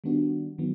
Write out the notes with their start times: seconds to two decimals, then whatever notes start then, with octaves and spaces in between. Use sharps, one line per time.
0.04 D#3 G3 B3 D4 F#4
0.58 D#3 F#3 B3